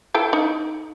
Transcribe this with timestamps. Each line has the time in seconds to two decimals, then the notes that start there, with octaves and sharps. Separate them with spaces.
0.14 E4 A4 G5
0.33 D#4